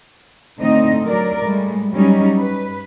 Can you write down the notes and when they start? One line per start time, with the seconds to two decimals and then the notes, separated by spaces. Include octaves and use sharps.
0.59 A2 D3 C4 D#4 D#5
1.06 F#3 A#4 D5
1.44 A2 G3 G#3
1.92 F#3 G3 C#4 D#4
2.38 B4